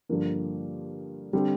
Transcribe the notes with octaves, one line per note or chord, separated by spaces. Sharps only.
G2 D3 F3 A#3
D3 G3 C4